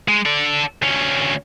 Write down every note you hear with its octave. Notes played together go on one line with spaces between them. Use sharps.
G#3
A4 D5
D2 C#4